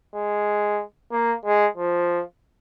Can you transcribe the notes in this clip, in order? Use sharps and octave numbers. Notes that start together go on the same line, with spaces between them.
G#3
A#3
G#3
F3